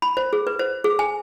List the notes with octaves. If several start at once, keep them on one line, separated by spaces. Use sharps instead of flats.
B5
C5
G#4
B4
C5
G#4
G#5